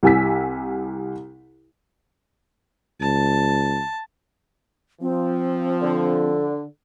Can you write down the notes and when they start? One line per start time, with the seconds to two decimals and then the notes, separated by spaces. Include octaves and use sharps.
0.03 C2 G4 G#5 E6 B6
3.01 C#2 A5
5.01 F3 C4
5.81 D3